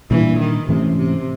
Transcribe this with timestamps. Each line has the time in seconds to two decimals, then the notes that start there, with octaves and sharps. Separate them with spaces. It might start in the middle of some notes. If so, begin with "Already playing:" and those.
0.10 A#2 E3 G3 A#3 D4
0.40 D#3
0.68 G#2 C3 E3 A3 C#4
0.97 C3